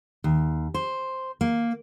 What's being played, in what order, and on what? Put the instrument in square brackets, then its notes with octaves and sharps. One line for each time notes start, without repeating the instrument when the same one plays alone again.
[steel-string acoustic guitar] D#2
C5
A#3